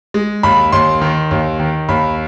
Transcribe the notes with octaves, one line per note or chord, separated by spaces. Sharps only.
G#3
D#2 B5
D#2 C6
D#3
D#2
D#3
D#2 B5